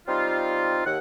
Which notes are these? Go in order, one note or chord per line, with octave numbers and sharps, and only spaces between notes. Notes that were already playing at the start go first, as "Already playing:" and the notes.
G3 C4 D#4 F4
D#2 F#5